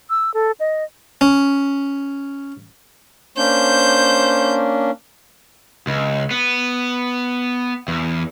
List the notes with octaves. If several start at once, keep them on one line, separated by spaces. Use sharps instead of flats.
E6
A4
D#5
C#4
A#3 C#4 D4 C5 G6
C#2
B3
E2